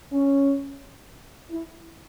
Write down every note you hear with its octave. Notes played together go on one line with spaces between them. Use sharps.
C#4
E4